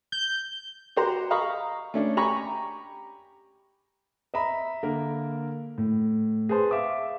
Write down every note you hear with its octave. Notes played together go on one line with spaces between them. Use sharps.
G6
F#4 G4 C5 A#5
D#5 F5 A#5 B5 C#6
A3 C#4 D4
G4 G#5 A#5 B5 C#6
D#5 E5 A#5 B5
D3 A#3 A#4
A2
G#4 B4 C5 A5 C6
E5 F5 D6